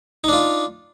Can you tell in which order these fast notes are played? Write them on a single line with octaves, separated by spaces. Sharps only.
D#4 D4 F4